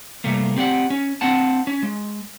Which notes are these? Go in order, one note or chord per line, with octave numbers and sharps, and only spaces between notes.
C3 G3 A3 A#3
C4 G4 D5 F#5
C#4
C4 D4 F#5 A5
C#4
G#3